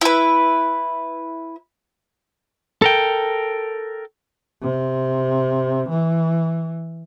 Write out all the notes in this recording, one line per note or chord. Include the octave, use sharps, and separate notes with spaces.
E4 B4
A4 A#4 G5
C3
E3